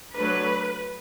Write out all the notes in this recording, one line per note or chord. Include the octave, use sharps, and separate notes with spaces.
F#3 A3 D4 B4